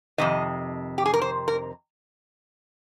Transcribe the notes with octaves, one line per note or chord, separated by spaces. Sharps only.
F2 C3 D#3 D#5
G4
G#4
A#4
C5
A#4